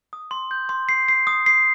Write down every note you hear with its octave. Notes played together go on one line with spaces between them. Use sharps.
D#6
C6
G6
C6
C7
C7
D#6
C7